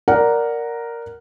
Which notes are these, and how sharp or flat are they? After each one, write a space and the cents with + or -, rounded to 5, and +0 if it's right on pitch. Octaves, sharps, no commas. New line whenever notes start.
A#4 +0 D5 +0 F#5 +0